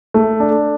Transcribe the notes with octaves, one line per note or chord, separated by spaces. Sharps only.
A3
D4